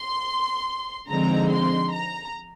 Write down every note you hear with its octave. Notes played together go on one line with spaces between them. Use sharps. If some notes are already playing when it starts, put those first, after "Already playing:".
Already playing: C6
D3 F3 G#3 C4 D#4 A#5
C6
A#5